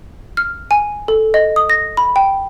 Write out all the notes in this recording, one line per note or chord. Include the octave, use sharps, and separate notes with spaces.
F6
G#5
A4
D#5
D#6
A#6
B5
G5